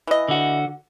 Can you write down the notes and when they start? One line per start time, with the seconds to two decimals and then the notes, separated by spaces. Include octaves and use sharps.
0.07 E3 D#5
0.28 D3 F#4